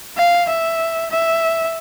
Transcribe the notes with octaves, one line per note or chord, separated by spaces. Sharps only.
F5
E5
E5